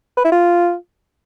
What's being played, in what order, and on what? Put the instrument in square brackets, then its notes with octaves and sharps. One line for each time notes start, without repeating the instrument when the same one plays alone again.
[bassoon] B4
E4
F4